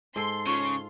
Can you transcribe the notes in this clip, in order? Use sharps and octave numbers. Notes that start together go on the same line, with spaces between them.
G#2 A4 C6
C#3 F4 C#6